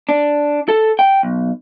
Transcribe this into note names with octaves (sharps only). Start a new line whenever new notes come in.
D4
A4
G5
B1